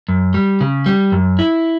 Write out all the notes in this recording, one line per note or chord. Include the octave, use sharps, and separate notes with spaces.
F#2
G3
C#3
G3
F#2
E4